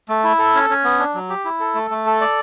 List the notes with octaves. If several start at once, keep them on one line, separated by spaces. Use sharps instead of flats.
A3
E4
A4
C#4
C#4
B3
D4
F#3
G4
E4
A4
A3
A3
A4
D5